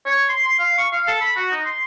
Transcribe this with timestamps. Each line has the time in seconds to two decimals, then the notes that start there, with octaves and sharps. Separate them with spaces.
0.06 C#5
0.29 C6
0.45 C6
0.59 F5
0.78 C#6
0.92 F5
1.08 A4
1.21 B5
1.36 F#4
1.51 D#4
1.65 C6